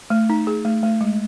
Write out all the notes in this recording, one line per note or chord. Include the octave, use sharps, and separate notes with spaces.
A3
D#4
G#4
A3
A3
G#3